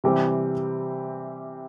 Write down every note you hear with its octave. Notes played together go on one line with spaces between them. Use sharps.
C3 E3 G3 C4 G4